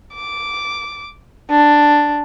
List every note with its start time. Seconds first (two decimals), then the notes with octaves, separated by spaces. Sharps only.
0.15 D6
1.50 D4